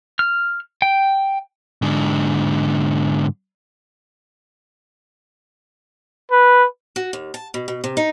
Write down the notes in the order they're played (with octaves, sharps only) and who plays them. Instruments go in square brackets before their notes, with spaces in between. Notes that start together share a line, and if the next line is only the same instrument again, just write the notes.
[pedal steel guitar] F6
G5
[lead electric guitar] G#2 D3
[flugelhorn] B4
[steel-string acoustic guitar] F#4
D#2
A5
B2
B2
C3
D#4